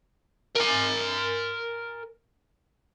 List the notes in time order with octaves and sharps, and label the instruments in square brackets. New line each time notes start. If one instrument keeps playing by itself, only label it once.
[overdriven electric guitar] A#4 G#5